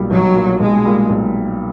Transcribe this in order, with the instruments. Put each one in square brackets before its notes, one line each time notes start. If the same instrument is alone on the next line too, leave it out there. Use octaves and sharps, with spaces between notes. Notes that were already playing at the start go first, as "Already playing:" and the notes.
Already playing: [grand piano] B1 A#2 G3
[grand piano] B1 [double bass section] F#3
[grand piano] A#2 G3
[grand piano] B1 [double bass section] G#3
[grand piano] A#2 G3
B1